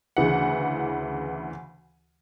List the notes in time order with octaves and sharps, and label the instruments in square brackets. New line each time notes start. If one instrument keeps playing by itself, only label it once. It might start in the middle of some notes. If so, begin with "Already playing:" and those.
[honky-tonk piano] D2 C#3 E3 F#5